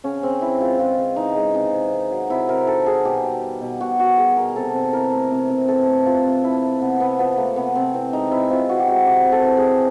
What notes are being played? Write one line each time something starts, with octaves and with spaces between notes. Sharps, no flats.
C#3 C#4
C#3 C4
E3 E4
G#3 F4
C#3 F4
C#3
E3 D#4
G#3
C3 D#4
C3
D#3
F#3
C3 E4
C3 A#4
D#3 A4
F#3 G#4
B2 G4
G3
G3
B2
B2 F#4
G3 F#4
G3 G#4
B2 A#4
C3 A4
C3
E3 A#4
A3
C3
C3
E3 A4
A3
C3 F4
C3
F3 E4
A3
C3 B3
C3 B3
F3 B3
A3 A#3
C3 B3
C3 C4
E3 C4
G#3 D#4
C3 E4
C3 F4
E3 F#4
G4
G#3 F#4
C3 G4
C3
A4
E3
G#4
G3